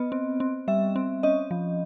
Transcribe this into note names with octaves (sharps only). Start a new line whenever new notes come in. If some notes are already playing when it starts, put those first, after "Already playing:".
Already playing: B3 D#5
C4
C4
G3 E5
C4
C#4 D#5
F3